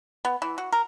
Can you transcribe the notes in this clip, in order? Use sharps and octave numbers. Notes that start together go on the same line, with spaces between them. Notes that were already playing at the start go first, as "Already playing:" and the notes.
B3
E3
F#4
A#4